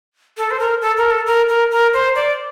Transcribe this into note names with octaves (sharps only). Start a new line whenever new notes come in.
A4
C5
A#4
A4
A#4
A4
A#4
A#4
A#4
C5
D5